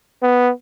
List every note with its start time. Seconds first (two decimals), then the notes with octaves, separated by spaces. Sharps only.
0.22 B3